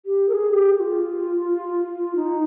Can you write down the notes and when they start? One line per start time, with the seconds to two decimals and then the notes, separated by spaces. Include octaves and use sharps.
0.06 G4
0.29 A#4
0.33 G#4
0.52 G4
0.75 G4
0.80 F4
2.16 D#4